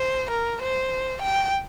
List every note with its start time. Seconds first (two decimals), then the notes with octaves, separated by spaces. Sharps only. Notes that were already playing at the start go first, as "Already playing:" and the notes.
Already playing: C5
0.31 A#4
0.62 C5
1.22 G5